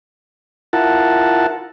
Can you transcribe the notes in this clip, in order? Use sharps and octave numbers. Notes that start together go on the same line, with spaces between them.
E4 F4 A#4 F#5 A5